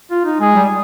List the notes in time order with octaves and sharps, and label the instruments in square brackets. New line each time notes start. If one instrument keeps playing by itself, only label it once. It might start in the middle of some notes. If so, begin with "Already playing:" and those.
[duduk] F4
D#4
[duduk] G#3 [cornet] G#4
[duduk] G3